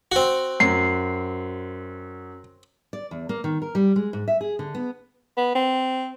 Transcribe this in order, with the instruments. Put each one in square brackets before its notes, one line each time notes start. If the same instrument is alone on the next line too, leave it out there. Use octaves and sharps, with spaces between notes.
[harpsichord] C4 F#4
[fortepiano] F#2 [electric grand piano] C7
[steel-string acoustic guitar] D5
E2
A#3
D#3
A#4
G3
G#3
G#2
E5
G#4
D3
B3
[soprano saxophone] B3
C4